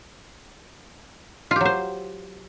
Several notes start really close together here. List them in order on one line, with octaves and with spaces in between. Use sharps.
F4 G4 F#3 C5